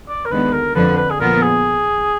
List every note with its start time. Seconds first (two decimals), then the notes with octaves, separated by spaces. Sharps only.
0.08 D5
0.25 A#4
0.31 D#2 D3 G#3 B3 B4
0.52 A#4
0.75 F2 D3 F3 B4
0.98 B4
1.10 G#4
1.20 A#2 F3 B3 F4 A#4
1.42 G#4